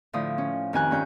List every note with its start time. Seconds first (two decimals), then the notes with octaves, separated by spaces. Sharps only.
0.13 A2 D3 F3 D#6
0.38 C#4
0.73 F2 D#3 G4 G#5 F#6
0.91 G2 C#4 G6